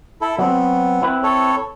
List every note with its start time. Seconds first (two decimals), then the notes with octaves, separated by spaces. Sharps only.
0.21 E4 A4
0.39 F#3 B3 C4
1.02 C4 E4 B4
1.23 A4 C#5